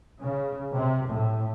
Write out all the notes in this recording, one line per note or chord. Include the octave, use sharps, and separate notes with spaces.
C#3
C3
A2